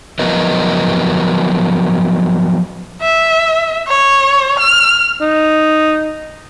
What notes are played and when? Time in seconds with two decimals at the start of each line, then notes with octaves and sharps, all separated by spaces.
0.19 F3 F#3 B3 A#4 B4 D#5
3.02 E5
3.88 C#5
4.59 F6
5.21 D#4